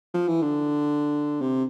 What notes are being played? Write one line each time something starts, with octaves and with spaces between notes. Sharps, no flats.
F3
E3
D3
C3